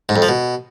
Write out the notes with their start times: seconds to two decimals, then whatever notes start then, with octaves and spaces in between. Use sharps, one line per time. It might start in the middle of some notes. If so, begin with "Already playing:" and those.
0.09 G#2
0.16 F2
0.22 F3
0.29 B2